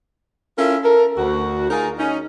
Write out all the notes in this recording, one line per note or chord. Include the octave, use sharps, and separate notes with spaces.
C#4 E4 F4 A4 A#4 E5
A4 A#4
D2 F#4
D#4 F4 G#4 A#4
C#4 D#4